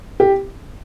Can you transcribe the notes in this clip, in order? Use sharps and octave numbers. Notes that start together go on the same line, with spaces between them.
G4